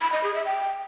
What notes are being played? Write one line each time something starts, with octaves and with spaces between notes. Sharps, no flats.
B5
D#5
G#4
E5
G5